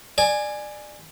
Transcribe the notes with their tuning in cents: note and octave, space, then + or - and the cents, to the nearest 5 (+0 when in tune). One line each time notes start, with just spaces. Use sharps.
D5 +25 G#5 +0